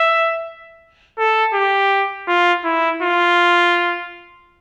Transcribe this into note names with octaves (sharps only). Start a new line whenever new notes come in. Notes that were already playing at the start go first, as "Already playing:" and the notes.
Already playing: E5
A4
G4
F4
E4
F4